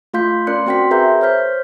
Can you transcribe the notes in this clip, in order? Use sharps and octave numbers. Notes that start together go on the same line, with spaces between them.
A3 F4 F5 C6 G6 B6
C#4 A#4 D5 C6 F#6 C#7
C4 F#4 G5 C6 B6
G#4 A#4 B4 E5 A#5 G6
C5 C#5 F6 G6 B6